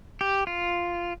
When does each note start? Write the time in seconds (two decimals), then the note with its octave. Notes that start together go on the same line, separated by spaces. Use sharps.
0.21 G4
0.47 F4